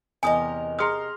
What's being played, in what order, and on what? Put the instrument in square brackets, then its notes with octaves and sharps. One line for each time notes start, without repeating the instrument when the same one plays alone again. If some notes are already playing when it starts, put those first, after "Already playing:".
[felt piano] E2 [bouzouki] C3 A#4 D#5 [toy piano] G#5 D#6
[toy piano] G#4 D#6 [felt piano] A#5 C6 F6